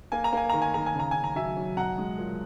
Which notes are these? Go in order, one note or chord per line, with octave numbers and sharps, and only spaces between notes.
A#3 G#5
A#5
A#3 G#5
D#3 A#5
G#5
D#3 A#5
G#5
C#3
A#5
C#3 G#5
A#5
F#3 E5 G#5
F#3
B1 F#5 A#5
G#3
A#2